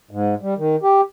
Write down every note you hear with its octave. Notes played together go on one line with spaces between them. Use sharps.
G#2
G3
D#3
G4